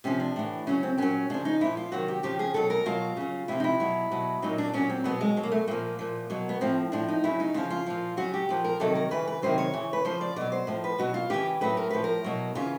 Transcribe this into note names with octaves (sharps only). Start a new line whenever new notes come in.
C3 F3 C#4
D4
A2 E3
C#3 F#3 C#4
C4
A#2 F#3 C#4
C#3 F3 D4
D#4
A#2 F3 E4
F4
C3 D#3 F#3 F#4
G4
C#3 F3 G4
G#4
B2 F#3 A4
A#4
B2 F#3 F4
C#3 F#3
C3 F3 E4
D#4
E4
B2 F#3
B2 F#3
A#2 F#3 D#4
D4
A#2 F#3 C#4
C4
B2 F#3 B3
G#3
B2 F#3
A#3
A3
A#2 F3 A#3
A#2 F3
B2 F#3
B3
A2 F3 C4
A2 F3 D4
D#4
C#3 F#3 E4
D#4
C#3 F3 F4
F4
A#2 F3
C#3 F#3 F#4
G4
A#2 F3
A#4
C3 D#3 F#3 A4
A#4
C#3 E3 B4
B4
C3 D#3 F#3 C5
C#5
C#3 E3
B4
C#3 F3 C5
D5
B2 F#3 D5
C5
A2 F3
B4
B2 F#3 F#4
F4
C#3 E3 G4
A2 F#3 B4
A#4
A2 F3 B4
A#4
B2 F#3
C#3 E3 F4